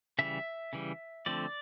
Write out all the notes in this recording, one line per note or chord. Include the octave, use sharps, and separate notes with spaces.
C#3 E3 G3 E5
C#3 E3 G3
D3 F3 A3 C4 D5